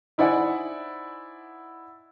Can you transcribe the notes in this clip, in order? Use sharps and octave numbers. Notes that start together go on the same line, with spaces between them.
D#4 E4 C5 D5 F#5 G#5